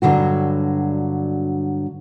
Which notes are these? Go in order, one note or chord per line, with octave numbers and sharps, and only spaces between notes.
G2 D3 F#3 F#4